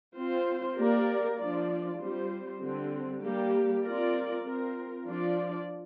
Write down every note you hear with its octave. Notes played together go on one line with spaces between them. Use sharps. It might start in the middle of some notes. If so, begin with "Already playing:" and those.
C4 F4 C5
A#3 G4 A#4 D5
F3 D4 F4 D5
G3 C4 F4 C5
D3 G3 C4
G3 A#3 G4
C4 F4 A#4 D5
C4 F4 A#4
F3 D4 F4 D5